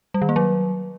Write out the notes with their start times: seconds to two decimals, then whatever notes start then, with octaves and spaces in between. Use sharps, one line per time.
0.14 G3
0.22 D#3
0.29 A#3
0.36 F#3